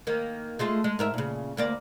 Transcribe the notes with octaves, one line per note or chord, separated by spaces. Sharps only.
D#3 A#3
G#3 A3 F4
G#3
G#2 A#4 E5
A#2 C#3
D2 A#3 D5